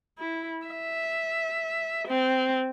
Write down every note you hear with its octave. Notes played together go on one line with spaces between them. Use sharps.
E4
E5
C4